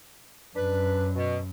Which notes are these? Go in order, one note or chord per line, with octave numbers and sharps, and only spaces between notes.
F#2 D4 B4
B2